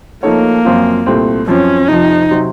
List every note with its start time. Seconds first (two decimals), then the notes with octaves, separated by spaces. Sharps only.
0.23 F3 A3 A#3 D#4 A4 C#5
0.65 F#2 F3 C4 F4
1.06 C2 A#2 A3 C4
1.47 F#2 F3 C4 C#4
1.88 F2 C3 F3 D#4
2.31 C3 F#3 C4